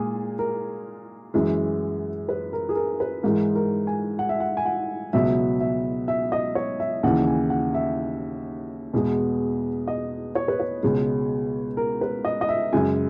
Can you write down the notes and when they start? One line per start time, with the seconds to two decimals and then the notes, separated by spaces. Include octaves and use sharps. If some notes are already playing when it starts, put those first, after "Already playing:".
Already playing: A#2 G#3 G#4
0.39 A#4
1.34 F#2 E3 G#3
2.29 B4
2.53 A#4
2.69 G#4
2.75 A#4
3.00 B4
3.23 G#2 E3 G#3 A#4
3.55 A#4
3.87 G#5
4.19 F#5
4.29 E5
4.40 F#5
4.57 G#5
4.66 F#5
5.13 C#2 B2 F#3 E5
5.60 E5
6.08 E5
6.32 D#5
6.55 C#5
6.80 E5
7.03 D#2 C#3 E3 F#5
7.27 G#5
7.50 F#5
7.74 E5
8.93 E2 B2 G#3
9.88 D#5
10.35 C#5
10.48 B4
10.60 C#5
10.83 C#2 B2 G#3
11.77 A#4
12.01 B4
12.25 D#5
12.41 D#5
12.49 E5
12.73 F#2 C#3 G#3 G#5